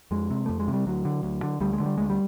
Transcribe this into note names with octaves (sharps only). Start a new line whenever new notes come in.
F2 G#3
C3
F2 A3
G#3
C3
G3
D2 F#3
D3
D2
D3
D2 G3
G#3
D3
G3
D2 G#3
G3